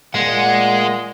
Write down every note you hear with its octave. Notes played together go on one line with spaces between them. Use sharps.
A#2 G#3 F#5